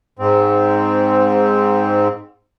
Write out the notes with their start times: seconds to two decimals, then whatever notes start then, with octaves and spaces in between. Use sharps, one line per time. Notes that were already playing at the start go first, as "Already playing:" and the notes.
0.19 G#2 C4